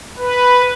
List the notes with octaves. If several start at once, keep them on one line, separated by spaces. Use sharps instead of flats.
B4